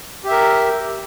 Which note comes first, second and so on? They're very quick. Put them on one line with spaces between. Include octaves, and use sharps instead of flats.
G4 E5 A#4